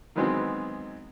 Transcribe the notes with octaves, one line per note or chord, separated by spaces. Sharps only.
D#3 E3 F#3 G#3 B3 C4